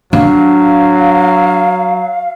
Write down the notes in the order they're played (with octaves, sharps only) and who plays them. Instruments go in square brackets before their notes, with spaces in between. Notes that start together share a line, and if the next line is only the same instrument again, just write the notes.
[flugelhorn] F#3 [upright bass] D4 [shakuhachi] F5